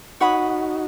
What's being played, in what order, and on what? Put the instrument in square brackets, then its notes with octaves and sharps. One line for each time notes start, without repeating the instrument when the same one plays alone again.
[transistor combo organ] D#4 F#4 [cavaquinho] C#5 F#5 B5 D#6